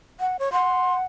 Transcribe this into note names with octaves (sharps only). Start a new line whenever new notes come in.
F#5
C#5
F#5 C6